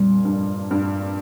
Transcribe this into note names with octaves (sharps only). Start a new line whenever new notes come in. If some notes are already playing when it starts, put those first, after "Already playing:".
Already playing: F2 A#2 G3
G2
G2